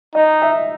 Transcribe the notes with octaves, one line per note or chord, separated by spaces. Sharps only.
D#4 D#5
E5